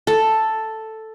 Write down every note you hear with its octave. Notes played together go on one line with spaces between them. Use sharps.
A4